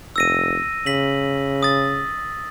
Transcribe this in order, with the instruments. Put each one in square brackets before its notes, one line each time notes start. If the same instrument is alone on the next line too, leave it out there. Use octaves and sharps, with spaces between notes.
[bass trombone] F1 [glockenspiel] E6 A#6 D#7
[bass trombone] C#3 [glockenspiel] B6 F#7
[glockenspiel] D#6 A6